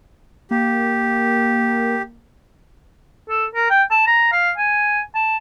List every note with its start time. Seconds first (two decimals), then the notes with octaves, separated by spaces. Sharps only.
0.51 A#3 G4
3.29 A4
3.55 A#4
3.70 G5
3.91 A5
4.07 A#5
4.32 F5
4.58 G#5
5.15 A5